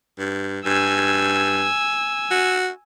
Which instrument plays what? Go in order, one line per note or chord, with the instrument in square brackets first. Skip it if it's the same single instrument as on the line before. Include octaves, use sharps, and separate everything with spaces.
[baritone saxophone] G2
[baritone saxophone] G2 [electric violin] G#5 E6
[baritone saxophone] F#4